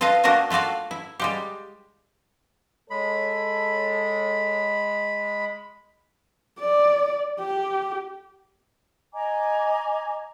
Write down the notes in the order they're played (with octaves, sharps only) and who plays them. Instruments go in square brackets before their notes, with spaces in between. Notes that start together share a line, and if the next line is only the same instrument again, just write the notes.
[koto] F4 A4 B4 D#5 F5
A#3 D4 F#4 A#4 D#5 E5
A3 F4 F#4 D5 F5
E4
G3 G#3 G4
[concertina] G#3 B5 [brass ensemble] A4 C#5
[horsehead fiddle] D5
G4
[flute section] D#5 G#5 A#5 D6